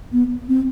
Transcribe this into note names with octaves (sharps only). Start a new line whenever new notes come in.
B3
C4